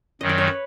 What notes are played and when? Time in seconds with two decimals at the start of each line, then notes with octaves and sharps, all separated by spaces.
0.21 F#2 D#3 F#3 D#5
0.29 D5
0.38 C#5
0.47 B4